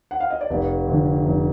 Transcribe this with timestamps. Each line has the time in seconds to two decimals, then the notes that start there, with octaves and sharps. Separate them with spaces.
0.11 F#5
0.20 F5
0.30 D#5
0.41 D5
0.50 F1 B4
0.87 F2 D3
1.26 F1